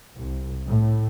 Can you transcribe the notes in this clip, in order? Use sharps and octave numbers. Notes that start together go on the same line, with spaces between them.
C2
A2